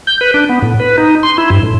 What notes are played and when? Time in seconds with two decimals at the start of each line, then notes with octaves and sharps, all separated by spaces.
0.07 G6
0.21 B4
0.34 D4
0.49 B3
0.62 A2
0.80 B4
0.98 D#4
1.23 C6
1.38 E4
1.50 G2
1.63 A2